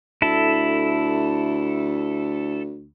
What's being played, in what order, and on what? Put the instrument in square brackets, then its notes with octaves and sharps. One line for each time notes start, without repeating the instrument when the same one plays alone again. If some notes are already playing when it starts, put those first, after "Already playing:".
[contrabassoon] D2 [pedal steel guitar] E4 A4